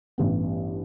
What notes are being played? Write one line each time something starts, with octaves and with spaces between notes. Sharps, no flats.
A1 G2 E3 B3